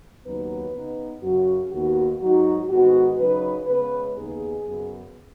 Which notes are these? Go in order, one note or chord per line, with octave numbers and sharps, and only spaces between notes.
D#2 C#3 F#3 B3 D#4 B4
C#3 B3 D#4
F#2 C#3 F#3 C#4 F#4
D#2 D#3 B3 F#4
G#2 F#3 D#4 F#4
G#2 D#3 G#3 B3 F#4
C#3 F#3 D#4 B4
C#3 G#3 B3 B4
D#2 C#3 B3 D#4 G#4
F#2 C#3 B3